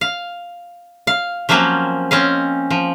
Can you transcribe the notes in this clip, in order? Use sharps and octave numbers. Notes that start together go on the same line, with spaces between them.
F5
F5
F3 F#3 A#3 C4 C#4
C4 C#4 D#5 F5
F3